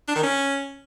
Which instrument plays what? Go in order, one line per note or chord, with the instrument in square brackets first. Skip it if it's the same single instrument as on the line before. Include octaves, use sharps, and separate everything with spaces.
[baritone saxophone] D4
D#3
C#4